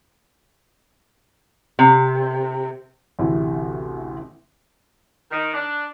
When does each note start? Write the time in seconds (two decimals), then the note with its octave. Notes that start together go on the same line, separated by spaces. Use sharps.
1.79 C3
3.19 A1 D2 C3 E4
5.31 D#3
5.54 D4